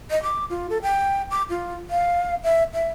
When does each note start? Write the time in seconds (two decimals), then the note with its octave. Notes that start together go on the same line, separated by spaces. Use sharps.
0.10 D#5
0.23 D6
0.50 F4
0.70 A4
0.82 G5
1.31 D6
1.49 F4
1.90 F5
2.44 E5
2.74 E5